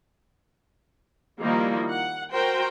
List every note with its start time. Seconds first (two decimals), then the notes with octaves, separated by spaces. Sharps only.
1.40 D#3 F3 G3 A#3 D#4 E4
1.89 F#5
2.31 F#4 A#4 C5 G5